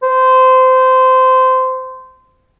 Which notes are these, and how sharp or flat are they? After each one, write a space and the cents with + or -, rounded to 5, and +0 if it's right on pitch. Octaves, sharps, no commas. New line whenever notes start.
C5 -20